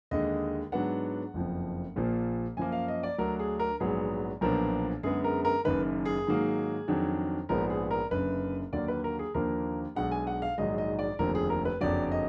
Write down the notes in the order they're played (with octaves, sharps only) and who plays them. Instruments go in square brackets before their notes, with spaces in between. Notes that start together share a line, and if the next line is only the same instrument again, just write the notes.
[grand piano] D#2 D3 G#3 D#5
G#2 F#3 B3 D4 F#5
F#1 F2 F3
A#1 A#2 F3 A#3
F#2 F3 A#3 G#5
F5
D#5
D5
D2 D3 F#3 D4 A#4
G#4
A#4
A#1 G#2 F#3 B3 G#4
B1 A#2 F3 B3 D4 A#4
F#2 D3 G#3 B3 G#4
A#4
A#4
F#1 F#2 D#3 B4
G#4
G#2 D#3 F#3 A#3
F2 D#3 F#3 D4
A#1 G#2 F3 B3 A#4
G#4
A#4
F#1 F#2 D3 B4
D#2 D3 F#3 A#3 D5
B4
A#4
G#4
D#2 D3 F3 A#3 D4 A#4
B1 B2 G#3 D4 F#5
G#5
F#5
F5
A#1 G#2 D#3 F#3 D#5
D#5
D5
F1 D#2 D3 F3 A#4
G#4
A#4
B4
F#1 F2 D3 F#3 D5
D#5